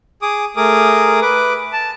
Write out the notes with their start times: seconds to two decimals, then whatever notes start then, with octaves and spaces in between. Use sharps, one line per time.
0.22 G#4 D6 D#6
0.56 A3 G#4 A#4 D6 D#6
1.22 B4 D6
1.73 A5